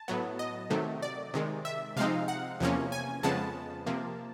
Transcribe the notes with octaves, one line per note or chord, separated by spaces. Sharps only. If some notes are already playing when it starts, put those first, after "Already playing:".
Already playing: A5
A2 F#3 B3
D#5
C3 D#3 F#3 A3
D5
C3 D#3 G#3
E5
C3 F3 G#3 C4 D#4 F5
F#5
E2 C3 F3 A#3 C#4
G#5
F2 C#3 F3 G#3 B3 A5
C3 F3 A#3